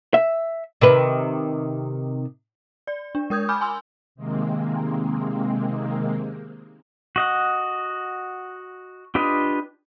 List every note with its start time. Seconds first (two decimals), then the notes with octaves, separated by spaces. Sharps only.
0.14 E5
0.81 C3 D#3 B4
2.87 D5
3.15 D4
3.30 G#3 A#4 D#6 G6 G#6
3.49 G#5 B5 D6 F6 G6
3.61 G#5 C6 E6
4.15 C3 D#3 G#3 A#3 C4
7.16 F#4 D#5 F#5
9.15 D4 F4 G4 B4 D#5